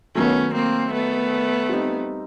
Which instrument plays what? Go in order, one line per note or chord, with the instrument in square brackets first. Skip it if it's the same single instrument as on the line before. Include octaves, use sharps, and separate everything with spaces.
[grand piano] D#3 F#3 A3 [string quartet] B3 C#4
[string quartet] A#3 C4
A3 B3
[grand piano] G3 C4 D#4